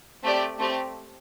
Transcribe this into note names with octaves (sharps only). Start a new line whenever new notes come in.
A3 C4 G4 D5
A3 C4 G4